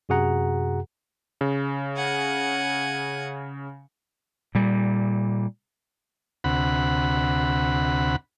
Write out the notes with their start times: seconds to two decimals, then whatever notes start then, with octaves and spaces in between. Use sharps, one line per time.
0.09 F#2 C3 F#4 G#4 F#5 A#5
1.41 C#3
1.96 F#5 G#5
4.55 A#2 G3
6.44 D2 C3 F#5 B5